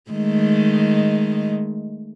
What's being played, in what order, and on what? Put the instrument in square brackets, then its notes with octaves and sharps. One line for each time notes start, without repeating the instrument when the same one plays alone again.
[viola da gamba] D#3 G#3 A3